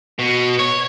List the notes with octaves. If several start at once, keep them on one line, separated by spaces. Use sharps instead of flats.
B2
C#5